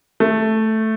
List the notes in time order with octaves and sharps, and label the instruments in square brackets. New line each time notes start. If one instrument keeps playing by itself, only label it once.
[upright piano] A3